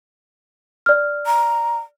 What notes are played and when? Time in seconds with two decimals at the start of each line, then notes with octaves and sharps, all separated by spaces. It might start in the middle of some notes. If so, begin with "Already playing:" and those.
0.86 D5 F6
1.26 A#5